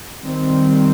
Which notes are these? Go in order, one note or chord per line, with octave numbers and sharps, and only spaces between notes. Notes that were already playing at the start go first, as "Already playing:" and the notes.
D#3 G3 C4